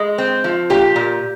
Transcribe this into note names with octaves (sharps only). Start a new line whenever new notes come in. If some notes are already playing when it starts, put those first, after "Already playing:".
Already playing: G#3
C4
F3
A#2 G4
A#2